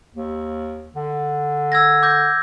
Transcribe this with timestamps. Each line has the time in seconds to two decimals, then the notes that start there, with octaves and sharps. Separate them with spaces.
0.15 D#2
0.95 D3
1.72 E6 G#6 A#6
2.03 D6 G6 A#6